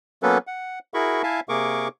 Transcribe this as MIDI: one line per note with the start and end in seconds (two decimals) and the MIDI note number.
0.23 0.38 54
0.23 0.38 58
0.23 0.38 59
0.23 0.38 61
0.23 0.38 69
0.23 0.38 71
0.47 0.79 78
0.94 1.22 64
0.94 1.22 66
0.94 1.22 68
0.94 1.22 70
0.94 1.22 83
0.94 1.22 85
1.23 1.40 64
1.23 1.40 76
1.23 1.40 77
1.23 1.40 80
1.23 1.40 81
1.49 1.88 48
1.49 1.88 58
1.49 1.88 68
1.49 1.88 70
1.49 1.88 85
1.49 1.88 86